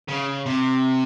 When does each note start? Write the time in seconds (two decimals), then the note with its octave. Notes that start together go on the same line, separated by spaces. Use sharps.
0.08 C#3
0.46 C3